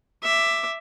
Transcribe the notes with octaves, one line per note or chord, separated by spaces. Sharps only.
E5 D6